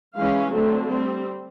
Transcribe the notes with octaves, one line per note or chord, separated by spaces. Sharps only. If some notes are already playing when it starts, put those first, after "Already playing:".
E3 G#3 C#4 F5
D3 F#3 A3 C4
G3 C4